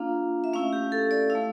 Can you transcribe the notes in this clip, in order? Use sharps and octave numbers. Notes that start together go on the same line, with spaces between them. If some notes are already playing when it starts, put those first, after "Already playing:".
Already playing: A#3 D4 F4 F5
E5
A3 C#4 E4 F5
G4
A4
D5
E4 F5
A3